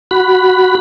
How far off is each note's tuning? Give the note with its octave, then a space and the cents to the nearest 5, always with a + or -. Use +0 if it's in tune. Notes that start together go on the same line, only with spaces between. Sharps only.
F#4 +0 B5 +0